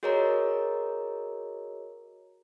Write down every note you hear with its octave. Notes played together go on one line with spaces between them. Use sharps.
F#4 G#4 A#4 C#5 D#5 A#5